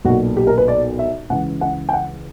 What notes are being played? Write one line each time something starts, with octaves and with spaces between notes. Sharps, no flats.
B1 A#2 F#4
G4
A#4
B4
D5
E5
C#2 C#3 E3 F#5
F#5
G5
F#5